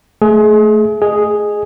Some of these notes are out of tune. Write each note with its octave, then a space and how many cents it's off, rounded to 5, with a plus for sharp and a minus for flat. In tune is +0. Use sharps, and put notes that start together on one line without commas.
A3 +0 G#4 +30
G#4 +0 D#5 -20